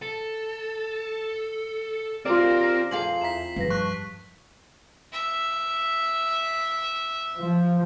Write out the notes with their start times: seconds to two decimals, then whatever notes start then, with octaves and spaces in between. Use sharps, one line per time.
0.02 A4
2.25 D#2 C4 F4 A#4 D5
2.91 F2 G#4 F5 A5 D6 C7 F#7
3.21 E2 E5 A#5 B6 E7
3.56 G2 F3 B4 A#6
3.70 A5 C#6 F#6
5.12 E5
7.37 F3